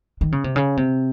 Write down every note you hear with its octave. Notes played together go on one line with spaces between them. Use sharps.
D#3
C#3
C3
C#3
C3